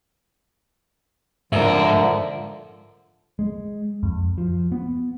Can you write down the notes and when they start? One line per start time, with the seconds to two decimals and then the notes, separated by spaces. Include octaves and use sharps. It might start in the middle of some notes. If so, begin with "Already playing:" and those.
1.53 G#2 D3 F3 A#4 E5
3.39 G#3
4.03 F2
4.38 F3
4.72 B3